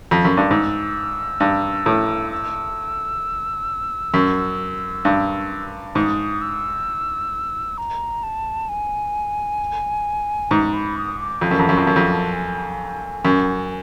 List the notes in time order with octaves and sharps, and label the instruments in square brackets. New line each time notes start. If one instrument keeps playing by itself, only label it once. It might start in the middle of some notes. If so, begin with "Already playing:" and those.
[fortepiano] F2
F#2
G2
[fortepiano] G#2 [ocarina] E6
[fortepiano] G2
A2
[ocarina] E6
[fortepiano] F#2
G2
[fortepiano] G#2 [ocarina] D#6
[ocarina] E6
A#5
A5
G#5
[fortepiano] G#2 [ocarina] A#5
[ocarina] B5
D#6
D6
[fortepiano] F2 [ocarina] A5
[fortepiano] F#2
F2
F#2
F2
F#2
F2
[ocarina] G#5
[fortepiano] F#2